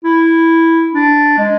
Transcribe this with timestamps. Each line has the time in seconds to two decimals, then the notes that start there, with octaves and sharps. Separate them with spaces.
0.04 E4
0.94 D4
1.38 G#3